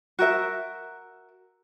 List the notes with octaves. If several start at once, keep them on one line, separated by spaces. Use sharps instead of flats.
F#4 A#4 E5